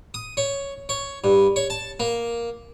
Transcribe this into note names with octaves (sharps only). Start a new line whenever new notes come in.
D#6
C#5
C#5
G2
C#5
A5
A#3